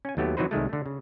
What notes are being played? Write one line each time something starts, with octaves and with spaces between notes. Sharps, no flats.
C#4 G#5
D#2 F#3 A3 B3 G4
E3 F#3 C4 D#4 B4 C5
C2 D#3 G#3 A3
D3 A3
C#3